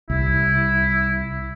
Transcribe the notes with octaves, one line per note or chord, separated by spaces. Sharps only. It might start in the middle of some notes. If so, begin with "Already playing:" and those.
C2 E4